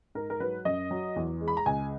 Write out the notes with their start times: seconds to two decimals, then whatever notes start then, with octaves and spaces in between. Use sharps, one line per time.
0.15 G#2 A#4
0.30 A#4
0.40 F#3 B4
0.65 F#2 D#5
0.91 F#3
1.16 E2
1.41 G#3
1.48 B5
1.57 A#5
1.66 C#2 G#5